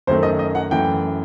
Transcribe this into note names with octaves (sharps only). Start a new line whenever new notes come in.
F#2 D#3 F#3 A3 C5
D#5
D#5
F#5
F#2 E3 A3 G5